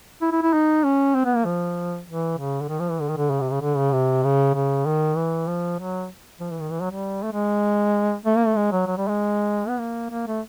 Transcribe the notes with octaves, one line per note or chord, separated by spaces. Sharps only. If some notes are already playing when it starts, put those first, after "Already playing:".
E4
E4
E4
D#4
C#4
C4
B3
A#3
F3
E3
C#3
D3
D#3
F3
E3
D3
D#3
D3
C#3
C3
C#3
D3
C#3
C3
C#3
C#3
D#3
E3
F3
F#3
F3
E3
D#3
E3
F#3
G3
A3
G#3
A3
A#3
A3
G#3
F#3
F#3
G3
G#3
B3
A#3
A#3
A3